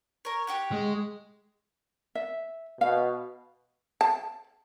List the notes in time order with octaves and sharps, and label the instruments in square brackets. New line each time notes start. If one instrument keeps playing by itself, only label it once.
[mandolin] A#4 C#5
G4 C#5 F#5
[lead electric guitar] G#3
[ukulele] E5
[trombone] B2 [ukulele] F5
[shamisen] A5